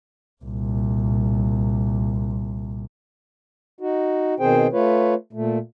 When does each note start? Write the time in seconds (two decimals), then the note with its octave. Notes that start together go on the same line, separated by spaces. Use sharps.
0.43 C2 A#2
3.81 D#4 F#4
4.40 B2 D#3 C4 G#4 C5 G5
4.73 A3 F4 B4 C#5
5.33 A#2 A3